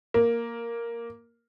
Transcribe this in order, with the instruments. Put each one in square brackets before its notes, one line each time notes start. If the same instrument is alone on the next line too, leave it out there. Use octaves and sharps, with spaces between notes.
[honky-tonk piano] A#3